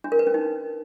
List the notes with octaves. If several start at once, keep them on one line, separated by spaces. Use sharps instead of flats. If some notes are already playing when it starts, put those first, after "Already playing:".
D4
A#4
B4
C#4
D#4